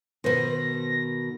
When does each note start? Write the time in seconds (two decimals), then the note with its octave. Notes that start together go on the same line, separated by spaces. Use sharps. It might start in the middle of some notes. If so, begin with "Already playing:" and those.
0.24 B2 D#3 B4 C5 A#6